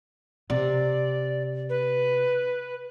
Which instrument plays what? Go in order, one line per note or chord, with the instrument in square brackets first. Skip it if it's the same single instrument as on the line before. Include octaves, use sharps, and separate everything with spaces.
[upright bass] C3 [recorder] D5
[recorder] B4